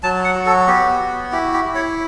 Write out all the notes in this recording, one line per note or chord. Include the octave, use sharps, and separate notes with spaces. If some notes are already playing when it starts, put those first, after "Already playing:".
F#3 A5
F#5
F#4
A4
B3 G4
F#4
E4 G4
G4
E4
C#5